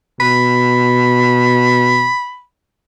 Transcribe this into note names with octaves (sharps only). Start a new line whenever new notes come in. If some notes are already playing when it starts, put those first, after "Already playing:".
B2 B5